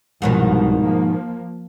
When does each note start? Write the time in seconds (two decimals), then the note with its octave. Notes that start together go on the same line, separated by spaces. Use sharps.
0.22 C2 G#2 B2 D#3 F3
0.84 F3 A#3